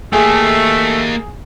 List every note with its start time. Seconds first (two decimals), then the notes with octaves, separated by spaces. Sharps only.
0.13 A3 A#3 G4 G#4